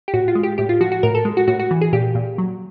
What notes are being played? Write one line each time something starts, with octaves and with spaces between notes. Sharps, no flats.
G4
A2 F#4
F4
G#3
G4
A2 G4
F4
F3 F#4
F#4
A2 A#4
A4
G#3
F#4
A2 F#4
F#4
E3
G#4
A#2 G4
A#2
F#3